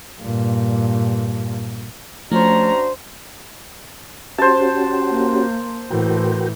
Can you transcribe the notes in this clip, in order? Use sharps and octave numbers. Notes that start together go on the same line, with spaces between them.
G2 A#2
F3 A3 C#4 D4 F#4 C5 A#5
C#4 F#4 G4 C5 A5
A#3
A2 E3 F#4 A#4 G5